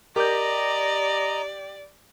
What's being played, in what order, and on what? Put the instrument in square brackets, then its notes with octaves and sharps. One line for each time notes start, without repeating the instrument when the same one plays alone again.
[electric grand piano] G4 D6 [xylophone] A#4 G6 [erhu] D5 [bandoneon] D#5 A#5